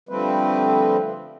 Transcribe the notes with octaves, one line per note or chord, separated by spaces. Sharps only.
D3 F3 G3 A3 C4 B4